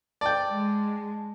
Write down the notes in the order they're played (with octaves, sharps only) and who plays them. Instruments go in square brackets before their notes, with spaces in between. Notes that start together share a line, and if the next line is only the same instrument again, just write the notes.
[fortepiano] D5 G5 [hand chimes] A5
[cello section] G#3